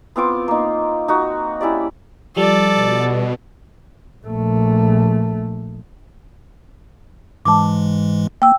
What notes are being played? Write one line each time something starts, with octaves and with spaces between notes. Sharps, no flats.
B3 C4 F4 D6
A#3 D#4
D#4 F#4
C#4 E4 G4 D5
F3 G3 A4 D5
B2
A#1 A3
G#2 E3 G#3 A5 D6
A#3 G5 E6